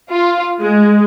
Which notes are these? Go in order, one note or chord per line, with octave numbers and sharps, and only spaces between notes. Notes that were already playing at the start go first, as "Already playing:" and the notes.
F4
G#3